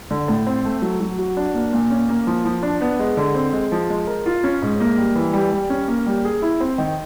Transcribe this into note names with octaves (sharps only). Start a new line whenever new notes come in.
D3
A2
C4
A3
F#3
F#3
F#4
D4
A#3
A#2
C#4
A#3
F3
F3
D4
B3
G#3
D3
C4
G#3
F3
G#3
A#4
F4
C#4
G#2
A#3
G3
E3
G3
G3
C#4
A#3
G3
G#4
E4
C4
D#3